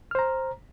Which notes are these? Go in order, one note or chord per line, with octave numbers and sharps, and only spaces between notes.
C5 A#5 F6